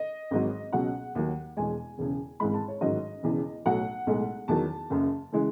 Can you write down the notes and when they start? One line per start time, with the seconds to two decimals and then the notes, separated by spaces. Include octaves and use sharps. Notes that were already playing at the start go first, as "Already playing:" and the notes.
Already playing: D#5
0.31 G#1 G#2 D#3 F#3
0.73 C#2 B2 F#3 F#5
1.15 D#2 D#3 F#3
1.57 E1 E2 B2 G#3 G#5
1.98 E1 E2 C#3
2.40 G#1 G#2 E3 G#3 B5
2.54 A5
2.68 C#5
2.81 A1 G#2 D#3 F#3 D#5
3.23 E1 E2 C#3 E3
3.66 B1 A2 F#3 F#5
4.07 B1 A2 G#3
4.48 E2 D#3 F#3 A5
4.90 F#1 F#2 C#3
5.32 C#3 E3 G#3